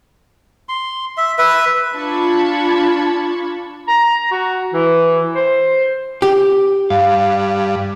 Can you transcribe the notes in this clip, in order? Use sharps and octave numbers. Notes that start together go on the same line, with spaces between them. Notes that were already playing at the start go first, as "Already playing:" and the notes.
C6
E5
B4 E5
D4 F4 A5 B5 C#6 G#6
A#5
F#4
E3
C5
G4
G2 F5